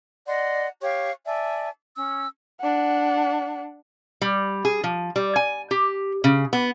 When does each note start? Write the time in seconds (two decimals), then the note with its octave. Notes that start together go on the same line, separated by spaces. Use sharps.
0.27 D5 D#5 F#5 C6
0.81 G4 C#5 F5 C#6
1.26 D5 E5 G#5 A5
1.96 C#4 E6
2.61 D4 F#5
4.21 G3
4.65 G#4
4.84 F3
5.16 G3
5.36 G#5
5.71 G4
6.24 C#3
6.53 B3